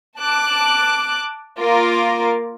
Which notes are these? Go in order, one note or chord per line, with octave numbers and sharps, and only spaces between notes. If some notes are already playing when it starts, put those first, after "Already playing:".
A5 D6 F#6
A#3 F4 A#4 D6